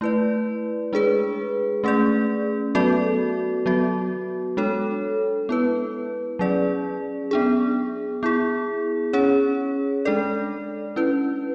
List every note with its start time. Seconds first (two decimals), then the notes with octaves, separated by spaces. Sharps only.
0.01 A3 E4 B4 D5
0.93 G#3 D4 G#4 B4
1.84 A3 C#4 G#4 D5
2.75 F#3 B3 F#4 A4 D5
3.66 F#3 B3 F#4
4.57 G#3 D4 A4 C#5
5.49 B3 E4 B4
6.39 F#3 C#4 G#4 D5
7.31 B3 D4 G#4
8.23 B3 E4 G#4
9.13 C#4 G#4 C#5
10.05 G#3 D4 A4 D5
10.96 C#4 E4 B4